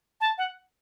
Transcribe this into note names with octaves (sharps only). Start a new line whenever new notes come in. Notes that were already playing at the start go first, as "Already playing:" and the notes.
A5
F#5